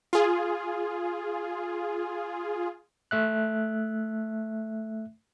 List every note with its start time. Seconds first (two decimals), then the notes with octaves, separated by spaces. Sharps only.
0.13 F4 G#4
3.11 A3 E5 F#6